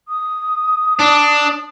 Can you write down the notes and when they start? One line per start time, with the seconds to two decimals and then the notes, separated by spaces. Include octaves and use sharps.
0.08 D#6
0.99 D4